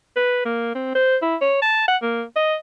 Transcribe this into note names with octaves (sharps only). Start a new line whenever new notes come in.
B4
A#3
C4
C5
E4
C#5
A5
F#5
A#3
D#5